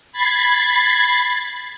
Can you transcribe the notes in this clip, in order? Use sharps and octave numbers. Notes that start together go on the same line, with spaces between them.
B5 G#6 A6 C7